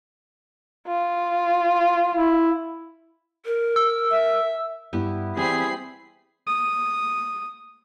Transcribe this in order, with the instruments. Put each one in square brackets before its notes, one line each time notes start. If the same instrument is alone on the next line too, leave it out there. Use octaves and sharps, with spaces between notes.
[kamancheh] F4
[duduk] E4
[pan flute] A#4
[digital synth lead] E6
[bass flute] E5
[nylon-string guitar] G2 [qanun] B3 E4 G4
[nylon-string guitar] E3 [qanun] G3 [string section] C4 B5 C7 [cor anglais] G#4
[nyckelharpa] D#6